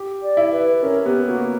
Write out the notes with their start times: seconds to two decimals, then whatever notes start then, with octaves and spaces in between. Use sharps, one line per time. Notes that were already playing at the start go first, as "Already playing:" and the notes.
Already playing: G4
0.22 D5
0.37 E4
0.52 B4
0.82 C#4 A#4
1.05 B3 G4
1.27 A#3 F#4